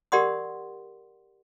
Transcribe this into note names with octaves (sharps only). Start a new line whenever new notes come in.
G4 A#4 D5 F#5 C6 D#6